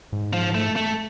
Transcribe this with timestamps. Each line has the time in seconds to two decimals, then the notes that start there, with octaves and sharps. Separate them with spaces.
0.13 G#2
0.33 F3
0.55 A3
0.76 A3